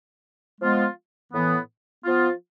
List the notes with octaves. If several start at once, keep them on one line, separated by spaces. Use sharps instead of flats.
F3 G#3 B3 F4
A2 E3 B3
F3 B3 F4